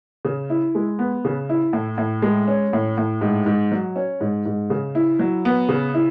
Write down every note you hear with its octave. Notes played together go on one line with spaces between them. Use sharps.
C#3
E4
G#3
B3
C#3
E4
A2
A2
G#3
C#4
A2
A2
G#2
G#2
F#3
C#4
G#2
G#2
C#3
E4
F#3
B3
C#3
E4